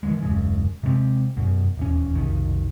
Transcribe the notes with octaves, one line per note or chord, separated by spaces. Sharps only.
D#3 E3 F#3 G#3
D#1 F#2 C#3 G#3
C3 G#3 A#3 C4
F#2 B2
D#1 E2 C#4
F1 B1 D#3